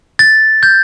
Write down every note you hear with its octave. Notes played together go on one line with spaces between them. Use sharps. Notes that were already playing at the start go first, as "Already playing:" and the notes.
A6
G6